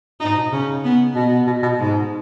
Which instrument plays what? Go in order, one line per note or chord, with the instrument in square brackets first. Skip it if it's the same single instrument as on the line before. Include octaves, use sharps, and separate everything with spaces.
[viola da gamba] D#4
[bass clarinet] G#2
B2
[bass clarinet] C#3 [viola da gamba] C#4
[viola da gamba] B3
[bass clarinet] B2 [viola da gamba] B3
[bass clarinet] B2
B2
[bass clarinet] G#2 [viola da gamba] G#3